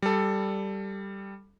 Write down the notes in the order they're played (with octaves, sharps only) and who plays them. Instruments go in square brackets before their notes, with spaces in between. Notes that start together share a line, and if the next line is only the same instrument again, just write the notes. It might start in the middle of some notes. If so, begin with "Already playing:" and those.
[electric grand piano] G3 A4